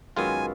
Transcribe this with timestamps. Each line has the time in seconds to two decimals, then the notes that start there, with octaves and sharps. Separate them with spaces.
0.17 F#2 D#3 G#3 B3 F4 G#5